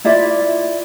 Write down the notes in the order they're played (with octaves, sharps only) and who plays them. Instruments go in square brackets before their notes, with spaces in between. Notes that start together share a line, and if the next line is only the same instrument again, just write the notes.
[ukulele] E4 F4 D5 E5